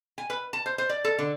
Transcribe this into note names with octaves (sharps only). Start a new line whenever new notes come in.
G#5
B4
A5
C5
C5
D5
A4
D3